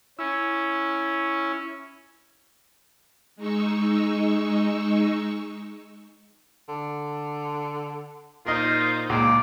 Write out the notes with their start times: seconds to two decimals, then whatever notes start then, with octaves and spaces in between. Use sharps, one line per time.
0.19 C#4 E4
3.36 G#3 D#4 C#6 E6
6.69 D3
8.46 A#2 D#4 F4 A#4 C5 D#5
9.09 C#2 A#2 G#4 D5